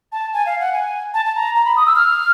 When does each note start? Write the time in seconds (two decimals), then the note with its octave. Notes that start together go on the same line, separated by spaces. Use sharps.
0.12 A5
0.33 G#5
0.46 F5
0.60 F#5
0.73 G#5
1.14 A5
1.26 A5
1.35 A#5
1.55 A#5
1.65 B5
1.76 D#6
1.86 E6
1.96 F6